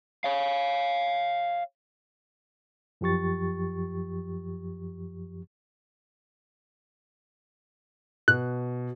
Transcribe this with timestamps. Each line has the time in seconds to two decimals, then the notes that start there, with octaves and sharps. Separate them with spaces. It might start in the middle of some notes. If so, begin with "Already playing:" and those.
0.24 C#5 F5
3.01 F#2 F3 G4 C#6 A6
8.28 B2 F#6